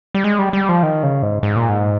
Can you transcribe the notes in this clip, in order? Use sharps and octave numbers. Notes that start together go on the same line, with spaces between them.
G3
G#3
G3
G3
F3
D#3
C#3
G#2
G#2
A#2
G#2